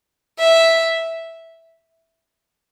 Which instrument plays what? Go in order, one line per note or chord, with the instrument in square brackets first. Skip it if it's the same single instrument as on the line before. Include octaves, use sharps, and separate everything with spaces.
[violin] E5